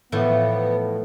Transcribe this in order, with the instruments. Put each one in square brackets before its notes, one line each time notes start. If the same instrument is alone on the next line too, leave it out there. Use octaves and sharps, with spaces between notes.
[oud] A2 [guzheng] E3 F3 A3 [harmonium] B3